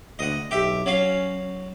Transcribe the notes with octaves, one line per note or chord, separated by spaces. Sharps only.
D2 D#5 F#5
B1 G4 E5
F#3 C#4 F5